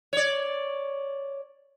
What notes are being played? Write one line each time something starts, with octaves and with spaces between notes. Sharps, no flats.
C#5 D5